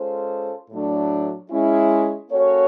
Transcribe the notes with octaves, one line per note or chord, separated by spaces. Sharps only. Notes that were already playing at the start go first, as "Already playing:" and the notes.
Already playing: G#3 C#4 F4 A4 C5
A2 F#3 A3 D4
G#3 C#4 E4
A#3 C#4 F#4 A4 C#5